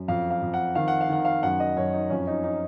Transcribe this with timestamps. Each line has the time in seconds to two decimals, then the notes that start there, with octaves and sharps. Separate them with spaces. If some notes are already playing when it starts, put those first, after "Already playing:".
Already playing: F#2
0.08 F2 F5
0.30 F5
0.42 F2
0.54 F#5
0.75 D#3 F5
0.88 F#5
1.01 F5
1.09 D#3 F#5
1.25 F5
1.43 F#2 F#5
1.60 D#5
1.77 F#2 C#5
1.93 D#4
2.10 F2 C#4
2.27 D#4
2.44 D#4